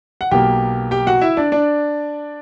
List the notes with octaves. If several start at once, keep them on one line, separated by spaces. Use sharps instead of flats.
F#5
B1 B2 A#3 G4 G5
G4 G5
F#4 F#5
E4 E5
D4 D5
D4 D5